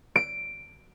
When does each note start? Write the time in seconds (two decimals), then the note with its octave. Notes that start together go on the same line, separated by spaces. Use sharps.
0.16 D7